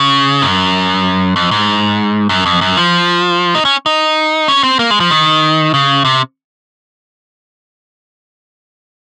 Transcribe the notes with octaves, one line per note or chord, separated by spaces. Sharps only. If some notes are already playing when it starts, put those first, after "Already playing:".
Already playing: C#3
F#2
F2
G#2
F#2
F2
F#2
F3
D#4
C#4
D#4
C#4
C4
A#3
G#3
F3
D#3
C#3
C3